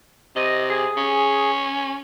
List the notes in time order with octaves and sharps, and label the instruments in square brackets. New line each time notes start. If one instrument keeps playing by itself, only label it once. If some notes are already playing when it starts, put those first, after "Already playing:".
[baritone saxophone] C3 [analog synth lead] D#5
[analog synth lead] G#4
[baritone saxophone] C#4